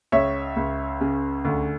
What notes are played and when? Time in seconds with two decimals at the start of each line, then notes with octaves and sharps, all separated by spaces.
0.12 C#2 C#5 E5
0.56 C#2
1.01 C#3
1.45 D2